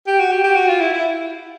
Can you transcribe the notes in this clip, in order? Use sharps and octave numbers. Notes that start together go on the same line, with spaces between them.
G4
F#4
G4
G4
F#4
F4
E4
E4